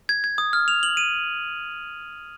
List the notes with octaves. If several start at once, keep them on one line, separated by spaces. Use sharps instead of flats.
G#6
G#6
D#6
F6
F7
F#7
D#7